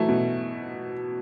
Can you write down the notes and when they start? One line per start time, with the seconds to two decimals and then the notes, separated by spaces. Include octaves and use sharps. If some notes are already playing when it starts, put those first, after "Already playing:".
Already playing: E3 F#3 A3
0.09 B2